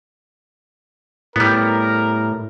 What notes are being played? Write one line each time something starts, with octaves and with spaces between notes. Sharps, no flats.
A2 G3 B3 A#4